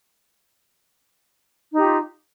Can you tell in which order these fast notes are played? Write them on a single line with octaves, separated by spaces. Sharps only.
D#4 G4 F4